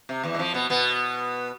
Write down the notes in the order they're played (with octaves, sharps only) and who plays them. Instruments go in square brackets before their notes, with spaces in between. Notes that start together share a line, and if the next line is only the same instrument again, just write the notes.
[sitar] C3
E2 E3
G#3
F2 F3
B2 B3
B2 B3